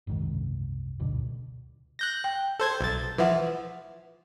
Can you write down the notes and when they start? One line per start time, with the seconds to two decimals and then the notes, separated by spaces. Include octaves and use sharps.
0.07 F#1 C2 G#2 D#3
0.99 F#1 D2 B2 D3
1.99 F#6 G6 A#6
2.24 G5
2.59 A4 C5 G#6
2.81 B1 A6
3.18 E3 F3 B4 E5 F#5